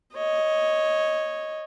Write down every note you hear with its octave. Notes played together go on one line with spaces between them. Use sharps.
C#5 D#5